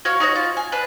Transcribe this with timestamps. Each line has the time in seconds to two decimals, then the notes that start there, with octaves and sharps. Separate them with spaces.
0.05 F#4 C#5 F5 C#6
0.20 D#4 F#4 C#5
0.35 F4
0.57 G#5
0.72 D4 B4